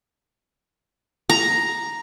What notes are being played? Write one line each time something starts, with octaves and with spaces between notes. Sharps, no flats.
A#5